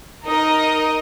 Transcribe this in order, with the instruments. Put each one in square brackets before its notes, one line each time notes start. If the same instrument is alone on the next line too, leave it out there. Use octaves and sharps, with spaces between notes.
[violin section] D#4 A#4 D#5